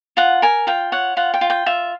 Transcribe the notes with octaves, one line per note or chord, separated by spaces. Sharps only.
F4 F#5
A#4 G#5
F4 G5
C#5 F#5
F4 F#5
G5
F4
G5
F4 E5